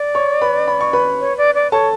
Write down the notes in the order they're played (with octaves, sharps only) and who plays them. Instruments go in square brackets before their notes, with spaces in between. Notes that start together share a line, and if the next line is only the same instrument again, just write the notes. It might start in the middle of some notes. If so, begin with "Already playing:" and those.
Already playing: [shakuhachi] D5
[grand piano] C#5 C#6
B4 B5
B5
C#6
B4 B5
[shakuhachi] C#5
D5
D5
[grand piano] A4 A5 [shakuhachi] C#5